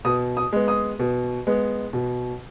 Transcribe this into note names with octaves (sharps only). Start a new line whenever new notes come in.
B2 D#6
D#6
G#3 B3
D#6
B2
G#3 B3
B2